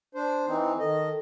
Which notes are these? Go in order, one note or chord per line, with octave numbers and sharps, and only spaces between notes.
D4 C5
E3 C4 D#4
D#3 A4 D#5